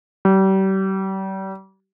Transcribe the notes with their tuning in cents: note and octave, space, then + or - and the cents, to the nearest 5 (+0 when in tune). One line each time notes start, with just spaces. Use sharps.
G3 -35